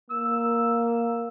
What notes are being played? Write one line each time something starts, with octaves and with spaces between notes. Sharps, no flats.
A#3 E6